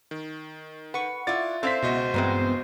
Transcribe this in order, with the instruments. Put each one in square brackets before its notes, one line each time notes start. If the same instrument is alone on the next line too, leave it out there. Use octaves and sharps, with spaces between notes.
[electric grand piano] D#3
[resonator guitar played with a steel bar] B4 [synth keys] F#5 C#6
[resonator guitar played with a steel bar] E4 D5 [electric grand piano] F4 A6
[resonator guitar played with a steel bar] C4 D4 E4 [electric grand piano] A4 F5 B6 [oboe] C5
[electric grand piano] C#2 F#4 D#5 [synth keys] B2
[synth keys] G2 B3 C4 [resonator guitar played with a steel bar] A#2 E3 G#3